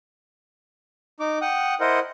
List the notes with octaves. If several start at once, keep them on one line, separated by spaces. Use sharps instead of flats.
D#4 D6
F#5 G5 D#6 F#6
E4 A#4 C5 D#5 F#5